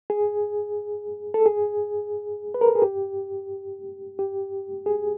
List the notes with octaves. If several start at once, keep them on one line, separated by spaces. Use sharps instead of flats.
G#4
A4
G#4
B4
A#4
A4
G#4
G4
G4
G#4